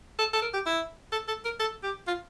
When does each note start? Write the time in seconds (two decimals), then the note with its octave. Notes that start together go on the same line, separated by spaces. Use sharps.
0.19 A4
0.33 A4
0.42 A#4
0.54 G4
0.66 E4
1.12 A4
1.28 A4
1.44 A#4
1.60 A4
1.83 G4
2.07 F4